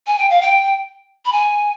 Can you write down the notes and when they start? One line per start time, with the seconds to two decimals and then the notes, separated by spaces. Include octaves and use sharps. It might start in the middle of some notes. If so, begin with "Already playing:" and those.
0.07 G#5
0.18 G5
0.30 F5
0.41 G5
1.25 B5
1.32 G#5